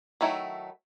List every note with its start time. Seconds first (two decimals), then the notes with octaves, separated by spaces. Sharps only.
0.21 D#3 F#3 A3 E4